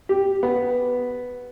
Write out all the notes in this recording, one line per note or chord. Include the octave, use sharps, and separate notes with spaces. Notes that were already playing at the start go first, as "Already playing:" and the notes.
G4
B3